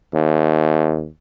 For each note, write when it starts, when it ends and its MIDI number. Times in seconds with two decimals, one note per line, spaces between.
0.14 1.08 39